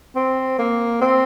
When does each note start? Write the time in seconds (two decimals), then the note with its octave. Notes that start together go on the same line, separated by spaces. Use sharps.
0.16 C4
0.59 A#3
1.01 C4